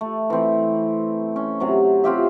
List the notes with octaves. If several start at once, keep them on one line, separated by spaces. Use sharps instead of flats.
A3
E3 C4
C#4
C3 F#3
C4 F4 G4 E5